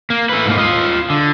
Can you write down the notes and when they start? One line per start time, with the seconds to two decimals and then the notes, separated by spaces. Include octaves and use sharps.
0.10 A#3
0.29 A3 B4
0.46 G#2 A#3
0.58 F4 D#5
1.10 D3